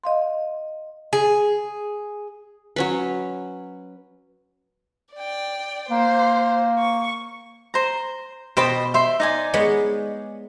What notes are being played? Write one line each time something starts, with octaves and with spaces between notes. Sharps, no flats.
D#5 F5 C6
G#4
F#3 C#4 B4
D5 G5
A#3 C5
C#6
C5 A#5
B2 C5 D#5 G5 A5 B5
C5 E5 C6
D#4 D5 G#5
G#3 B3 C#5